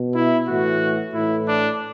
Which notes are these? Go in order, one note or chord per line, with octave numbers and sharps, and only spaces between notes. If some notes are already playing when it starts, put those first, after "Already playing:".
Already playing: B2
E4
A2 E3 F#4
A2 E3 E4
D4